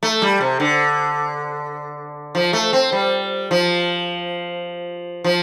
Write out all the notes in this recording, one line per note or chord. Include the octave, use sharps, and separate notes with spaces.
A3
G3
C3
D3
F3
A3
C4
G3
F3
F3